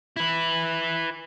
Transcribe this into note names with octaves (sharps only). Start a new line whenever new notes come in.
E4 B4